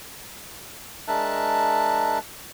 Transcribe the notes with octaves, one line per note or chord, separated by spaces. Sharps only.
G#3 D4 A#4 E5 A5 F#6